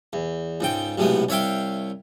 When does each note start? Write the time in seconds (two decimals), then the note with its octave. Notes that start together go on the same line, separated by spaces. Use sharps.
0.13 E2
0.60 C#2 G#2 G5
0.98 B1 A2 C3 G#3 B3
1.29 C2 C#5 E5 F5 G5